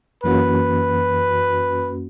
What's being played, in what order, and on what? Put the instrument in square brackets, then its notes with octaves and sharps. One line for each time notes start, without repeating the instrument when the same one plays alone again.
[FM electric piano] F#2 E3 A#3 C#4 F#4 [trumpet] B4